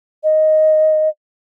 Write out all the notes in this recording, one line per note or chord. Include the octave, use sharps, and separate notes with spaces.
D#5